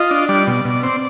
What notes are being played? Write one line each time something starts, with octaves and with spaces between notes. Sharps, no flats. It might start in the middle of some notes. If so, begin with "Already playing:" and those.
Already playing: F4 D#5
D4
G3 D5
B2
B2
C4